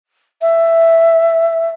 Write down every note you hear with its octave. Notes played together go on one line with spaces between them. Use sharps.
E5